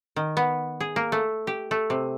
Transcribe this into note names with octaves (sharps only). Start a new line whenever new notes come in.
D#3
B3
G#4
A#3
A3
G4
A3
C3